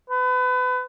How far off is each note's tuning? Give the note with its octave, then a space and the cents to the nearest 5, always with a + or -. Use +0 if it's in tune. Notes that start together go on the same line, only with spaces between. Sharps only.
B4 +30